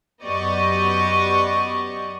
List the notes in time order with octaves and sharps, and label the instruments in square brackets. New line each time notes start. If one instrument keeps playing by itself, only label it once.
[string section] F#2 B3 G4 D5 D#5 C#6